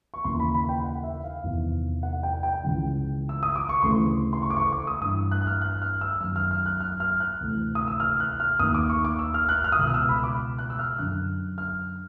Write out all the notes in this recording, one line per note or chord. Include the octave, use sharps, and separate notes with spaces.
C#6
D#2 C#3 E3 C6
B5
B5
G5
F#5
E5
F5
E2 C3 D#3
F#5
G5
G5
C#2 C#3 E3
E6
D#6
D6
C#6
D2 C#3 E3 C6
C6
C#6
D6
C#6
D6
D#6
G2 E3 D#6
F#6
F#6
F6
F#6
F6
E6
F#2 D#3 F6
F6
F6
F#6
F6
F6
F#6
D2 C3 E3
D#6
E6
F6
F#6
F6
D#2 D#3 D#6
D6
C#6
D6
E6
F6
F#6
F6
D#6
C#2 B2 E6
F6
E6
B5
D6
F#6
E6
F6
F#2 D3 F#6
F6